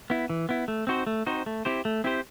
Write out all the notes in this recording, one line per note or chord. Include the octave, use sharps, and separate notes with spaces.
B3 E4
E3
B3 E4
A3
C4 D#4 F#4 C5
A3
C4 D#4 F#4 C5
A3
C4 E4 G4 C5
A3
C4 E4 G4 C5